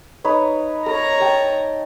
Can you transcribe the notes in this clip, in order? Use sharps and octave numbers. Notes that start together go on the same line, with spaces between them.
D#4 B4 C#5
A#4 C#5 A#5
D#5 G5 A5